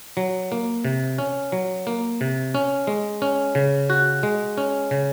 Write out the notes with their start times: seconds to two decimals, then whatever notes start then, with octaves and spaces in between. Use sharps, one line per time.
0.17 F#3
0.52 A#3
0.85 C3
1.18 C#4
1.52 F#3
1.87 A#3
2.21 C3
2.55 C#4
2.87 G#3
3.22 C#4
3.55 C#3
3.90 F#4
4.23 G#3
4.58 C#4
4.91 C#3